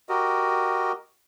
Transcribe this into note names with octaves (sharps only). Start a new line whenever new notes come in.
F#4 G4 A#4 D#5